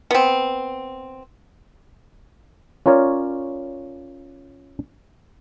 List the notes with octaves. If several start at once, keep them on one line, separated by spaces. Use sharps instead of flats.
B3 C4
C#4 F4 A#4 C#5 D5